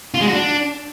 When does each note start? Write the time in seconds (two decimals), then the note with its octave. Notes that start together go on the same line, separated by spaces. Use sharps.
0.14 F4
0.21 G#3
0.27 F#4
0.33 D4